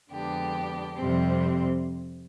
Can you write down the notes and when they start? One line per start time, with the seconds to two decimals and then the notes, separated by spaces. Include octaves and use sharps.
0.11 F2 D3 G#3 B3 D4 G4
0.95 F2 C3 G3 C4